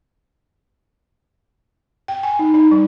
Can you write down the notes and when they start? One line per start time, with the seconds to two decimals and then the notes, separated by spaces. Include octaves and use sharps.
2.08 G5
2.23 G#5
2.39 D#4
2.54 D#4
2.71 G3